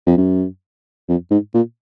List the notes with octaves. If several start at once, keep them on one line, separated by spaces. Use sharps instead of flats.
F2
F#2
F2
G#2
A#2